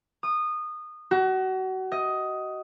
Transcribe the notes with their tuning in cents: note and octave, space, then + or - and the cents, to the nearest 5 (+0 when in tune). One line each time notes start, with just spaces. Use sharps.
D#6 -20
F#4 +30
D#5 +10